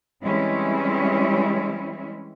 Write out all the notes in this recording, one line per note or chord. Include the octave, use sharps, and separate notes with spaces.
E3 G3 G#3 C4 C#4 E4